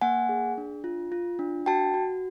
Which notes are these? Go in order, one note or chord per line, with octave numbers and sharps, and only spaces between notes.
A#3 F#5 G#5
G#4
D4
F4
F4
D4
F#4 G5 A5
F#4